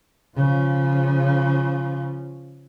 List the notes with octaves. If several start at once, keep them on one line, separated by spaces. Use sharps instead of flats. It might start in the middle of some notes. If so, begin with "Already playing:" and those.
C#3 F3